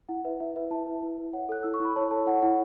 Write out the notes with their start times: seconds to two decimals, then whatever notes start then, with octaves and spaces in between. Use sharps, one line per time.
0.08 E4 F#5
0.25 B4 E5
0.40 E4 E5
0.56 B4 E5
0.71 E4 A5
0.87 B4
1.03 E4
1.18 B4
1.33 C#5 F#5
1.49 A4 F#6
1.63 E4 E6
1.74 C#6
1.80 E4 B5
1.96 C#5 A5
2.11 A4 A5
2.26 E4 F#5
2.42 E4 F#5